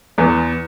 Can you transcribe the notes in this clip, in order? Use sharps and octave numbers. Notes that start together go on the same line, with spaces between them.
E2 E3 B3